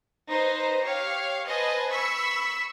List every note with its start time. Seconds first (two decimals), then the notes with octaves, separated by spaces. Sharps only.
0.29 D#4 B4 C5
0.85 G4 C#5 F5
1.46 B4 C5 D#5 G#5 A5
1.90 B5 C#6 E6 B6